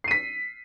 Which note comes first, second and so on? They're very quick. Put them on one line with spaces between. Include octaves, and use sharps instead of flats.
C7 D#7 B6